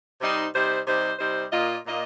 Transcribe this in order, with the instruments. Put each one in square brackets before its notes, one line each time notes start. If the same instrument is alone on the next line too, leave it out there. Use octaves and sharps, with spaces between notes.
[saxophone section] C3 G3 D#4 C5
C3 G3 D#4 C5
C3 G3 D#4 C5
C3 G3 D#4 C5
A#2 A#3 F4 D#5
A#2 A#3 F4 D#5